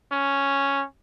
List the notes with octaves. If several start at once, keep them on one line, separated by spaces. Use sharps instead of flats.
C#4